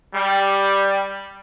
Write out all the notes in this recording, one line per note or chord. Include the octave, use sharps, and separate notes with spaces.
G3